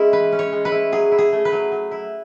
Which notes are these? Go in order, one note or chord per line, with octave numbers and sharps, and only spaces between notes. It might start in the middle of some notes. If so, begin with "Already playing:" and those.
Already playing: G#3 C#4 E4
E3 B4
C#4
C#5
G#3
B4
E4
F#3 G#4
E4
G#4
A3
B4
F#3
F#3
E4